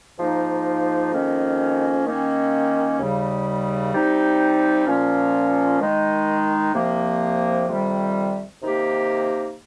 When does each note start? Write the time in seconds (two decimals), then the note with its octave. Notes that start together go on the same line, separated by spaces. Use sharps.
0.18 G#2 F3 A#3 D#4
1.11 F2 D#3 A#3 C#4
2.06 D#3 A#3 C#4
2.99 D#2 C#3 G3
3.93 C3 G3 C4 D#4
4.87 A#2 F3 A#3 C#4
5.80 D#3 G#3 D#4
6.74 C2 C3 F3 A#3
7.68 F2 C3 D#3 G3
8.62 C3 D#3 A#3 D#4 G4